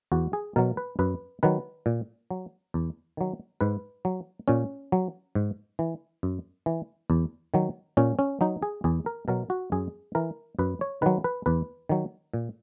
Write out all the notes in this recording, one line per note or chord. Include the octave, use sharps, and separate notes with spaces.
E2 F#4
G#4
B2 F#3 A#4
B4
F#2 B4
D#3 F#3 B4
A#2
F#3
E2
D#3 F#3
G#2 B4
F#3
A#2 C#4
F#3
G#2
E3
F#2
E3
E2
D#3 F#3
A#2 C#4
C#4
F#3 D#4
G#4
E2 G#4
A#4
B2 F#3 A#4
F#4
F#2 G#4
E3 A#4
F#2 B4
C#5
D#3 F#3 B4
B4
E2 B4
D#3 F#3
A#2